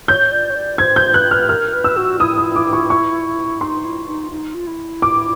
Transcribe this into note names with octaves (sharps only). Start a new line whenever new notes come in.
C#5 G6
D5
C#5
D5
C5 G#6
G6
B4 F#6
F6
A#4 F6
B4
E6
F#4
E4 D#6
D#6
D6
C#6
C#6
D#4 C6
E4
D#4
D#4
F4
E4
D6